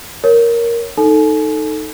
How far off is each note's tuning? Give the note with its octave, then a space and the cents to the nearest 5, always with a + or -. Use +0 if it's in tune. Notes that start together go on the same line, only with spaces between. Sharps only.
A#4 +0 C#5 +0
D#4 +0 A4 +0 G#5 +40